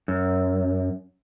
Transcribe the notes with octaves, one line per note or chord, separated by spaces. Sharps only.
F#2